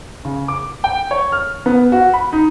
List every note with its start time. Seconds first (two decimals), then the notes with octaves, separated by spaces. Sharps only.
0.25 C#3
0.48 D6
0.84 G5
1.11 C#5
1.32 F6
1.66 B3
1.92 F#4
2.14 B5
2.33 D#4